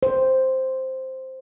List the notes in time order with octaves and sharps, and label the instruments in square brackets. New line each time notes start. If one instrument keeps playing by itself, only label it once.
[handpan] C5